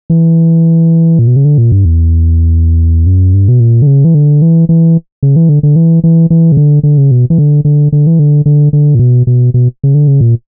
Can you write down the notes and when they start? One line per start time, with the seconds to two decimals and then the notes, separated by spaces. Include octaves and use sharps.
0.10 E3
1.19 A#2
1.27 B2
1.36 C#3
1.45 D3
1.58 A#2
1.72 G2
1.85 E2
3.06 F#2
3.34 G2
3.48 B2
3.60 A#2
3.82 D3
3.87 C#3
4.05 E3
4.15 D3
4.42 E3
4.69 E3
5.23 C#3
5.36 E3
5.49 D3
5.63 D3
5.76 E3
6.04 E3
6.30 E3
6.52 C#3
6.57 D3
6.83 D3
6.98 C#3
7.11 B2
7.30 E3
7.38 D3
7.65 D3
7.92 D3
8.07 E3
8.19 D3
8.46 D3
8.73 D3
8.95 A#2
8.99 B2
9.27 B2
9.54 B2
9.84 C#3
9.94 D3
10.08 C#3
10.21 A#2